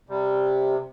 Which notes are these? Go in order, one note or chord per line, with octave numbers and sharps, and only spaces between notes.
C3 G3